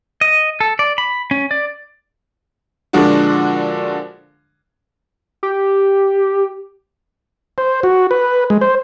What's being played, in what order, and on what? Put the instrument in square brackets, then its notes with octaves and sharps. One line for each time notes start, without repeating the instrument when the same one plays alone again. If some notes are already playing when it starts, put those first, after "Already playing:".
[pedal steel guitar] D#5
A4
D5
B5
C#4
D5
[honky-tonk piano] A#2 D3 F3 G#3 D4 F#4
[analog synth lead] G4
[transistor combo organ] C5
F#4
B4
G#3
C5